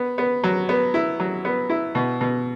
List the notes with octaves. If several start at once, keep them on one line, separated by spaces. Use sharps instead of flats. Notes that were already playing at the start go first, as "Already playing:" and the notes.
Already playing: B3
B3
F#3
B3
E4
F#3
B3
E4
B2
B2